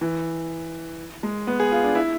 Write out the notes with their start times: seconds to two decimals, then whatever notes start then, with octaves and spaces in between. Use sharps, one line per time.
0.01 E3
1.23 G#3
1.47 B3
1.60 G#4
1.72 F4
1.84 D4
1.95 E4